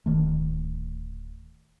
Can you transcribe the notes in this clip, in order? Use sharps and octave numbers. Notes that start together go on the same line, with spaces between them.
D1 D#3 A3